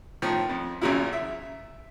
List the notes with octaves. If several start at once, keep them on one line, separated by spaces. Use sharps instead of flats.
A2 D#3 F3
F2
G#1 F#2 A#2 C#3 F#3 E4
E5